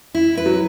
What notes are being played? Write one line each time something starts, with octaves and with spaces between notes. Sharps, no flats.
E4
B4
F#3